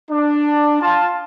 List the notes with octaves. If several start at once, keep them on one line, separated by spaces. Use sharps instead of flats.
D4
F4 A5